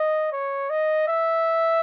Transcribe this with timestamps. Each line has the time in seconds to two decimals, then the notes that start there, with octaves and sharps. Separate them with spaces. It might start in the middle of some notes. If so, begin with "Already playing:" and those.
Already playing: D#5
0.32 C#5
0.70 D#5
1.07 E5